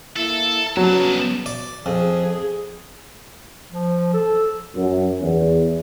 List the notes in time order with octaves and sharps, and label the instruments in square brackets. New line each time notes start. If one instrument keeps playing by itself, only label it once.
[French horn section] A#3 E4 [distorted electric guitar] A4
[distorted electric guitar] C2 A5 [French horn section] C#3 B3 [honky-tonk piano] F#3
[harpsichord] D5
[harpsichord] F2 [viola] G#4
[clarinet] F3
A4
[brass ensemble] F#2
E2